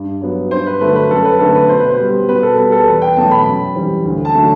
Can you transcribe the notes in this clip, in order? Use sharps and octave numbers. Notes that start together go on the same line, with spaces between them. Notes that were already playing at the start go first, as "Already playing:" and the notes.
Already playing: G2
F#3 B3
G2 C5
B4
D3 F#3 A3 B4
B4
F#2 A4
B4
D3 A3 C4 A4
B4
B2 C5
B4
C5
G3 B3
B2 B4
A4
G3 B3 B4
A4
E2 B4
G5
B2 F#3 A3 A5
B5
F#2
E3 G3 C4
D2
A5
D3 F#3 A3